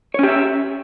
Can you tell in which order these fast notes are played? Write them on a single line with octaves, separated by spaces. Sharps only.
C#5 C#4 G4 E5